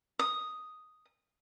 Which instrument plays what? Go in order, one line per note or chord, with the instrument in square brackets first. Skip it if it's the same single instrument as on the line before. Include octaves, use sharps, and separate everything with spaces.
[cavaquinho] D#6